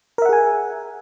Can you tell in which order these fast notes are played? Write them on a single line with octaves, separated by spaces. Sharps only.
A#4 E5 F#5 G#4 G#5